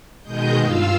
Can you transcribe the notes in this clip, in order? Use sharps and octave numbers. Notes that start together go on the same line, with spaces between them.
B2 D#3 G#3 D#5 G6
G2 F4 F5 E6